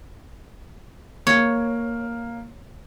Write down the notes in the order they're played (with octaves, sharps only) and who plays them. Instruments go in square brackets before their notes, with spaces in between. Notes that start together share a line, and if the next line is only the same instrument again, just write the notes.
[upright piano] A#3 [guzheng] C#5